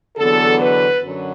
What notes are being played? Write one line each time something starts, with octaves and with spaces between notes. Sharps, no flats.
E2 D3 F#3 B3 A4
B4
F#2 D3 F#3